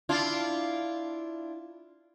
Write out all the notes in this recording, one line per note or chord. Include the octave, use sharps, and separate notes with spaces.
D4 E4 F4